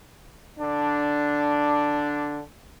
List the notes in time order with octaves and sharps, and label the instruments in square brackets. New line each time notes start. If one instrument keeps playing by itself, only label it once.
[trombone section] D3 D4